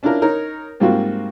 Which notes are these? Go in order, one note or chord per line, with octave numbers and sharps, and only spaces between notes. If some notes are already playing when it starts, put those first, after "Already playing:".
C#4 D4 E4 F4 A#4
D#4 A#4 C#5
G#2 G3 A#3 C4 F4 F#4